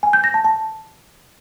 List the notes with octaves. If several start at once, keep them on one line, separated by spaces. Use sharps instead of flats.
G#5
G6
A#6
A5
A5